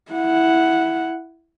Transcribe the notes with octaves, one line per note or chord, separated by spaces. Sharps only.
E4 F#5